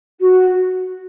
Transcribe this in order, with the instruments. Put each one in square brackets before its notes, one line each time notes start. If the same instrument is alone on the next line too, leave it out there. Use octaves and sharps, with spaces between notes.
[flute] F#4